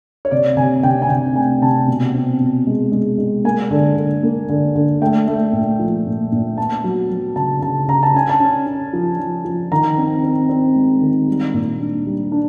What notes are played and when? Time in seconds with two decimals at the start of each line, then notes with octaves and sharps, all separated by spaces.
0.25 C#5
0.31 C3 D5
0.57 C3 G#5
0.83 C3 G5
1.02 G#5
1.09 C3 G5
1.35 A3 G#5
1.62 C3 A5
1.88 B2
2.14 C4
2.40 B2
2.67 G#3
2.92 G#3
3.18 G#3
3.44 A#3 G#5
3.71 D3
3.96 D3
4.23 A#3
4.49 D3
4.75 D3
5.02 A3 G5
5.28 A3
5.53 A#2
5.79 F3
6.06 A#2
6.32 A#2
6.58 B3 A5
6.84 F#3
7.10 F#3
7.36 C#3 A5
7.62 C#3 A5
7.88 C#3 A#5
8.03 A5
8.14 C#4 G#5
8.29 A5
8.40 C#4
8.66 C#4
8.93 F3
9.19 F3
9.45 F3
9.71 D#3 A#5
9.98 C4
10.23 C4
10.49 C4
10.75 G#3
11.01 D#3
11.28 G3
11.54 A#2
11.80 D4
12.07 G3
12.32 D4